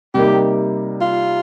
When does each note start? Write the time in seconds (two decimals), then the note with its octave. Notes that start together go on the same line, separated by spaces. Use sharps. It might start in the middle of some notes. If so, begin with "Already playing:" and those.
0.14 C3 G3 A#3 D#4 G4
1.01 F4